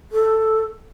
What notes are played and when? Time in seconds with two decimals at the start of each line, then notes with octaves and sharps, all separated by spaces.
0.12 A4